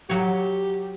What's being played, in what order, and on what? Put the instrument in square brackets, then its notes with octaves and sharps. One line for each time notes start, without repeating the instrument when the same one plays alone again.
[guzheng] F#3 C#5 [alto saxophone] G4